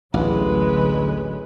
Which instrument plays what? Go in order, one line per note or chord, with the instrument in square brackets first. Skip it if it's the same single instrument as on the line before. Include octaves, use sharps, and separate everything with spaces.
[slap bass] A1 D2 [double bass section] D3 F#3 [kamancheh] G#3 B4